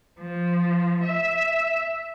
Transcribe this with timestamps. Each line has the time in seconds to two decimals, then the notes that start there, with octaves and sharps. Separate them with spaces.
0.20 F3
1.03 E5